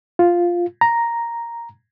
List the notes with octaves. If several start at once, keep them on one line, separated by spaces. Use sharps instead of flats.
F4
A#5